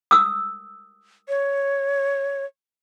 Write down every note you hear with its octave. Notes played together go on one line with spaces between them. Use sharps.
D#6 E6
C#5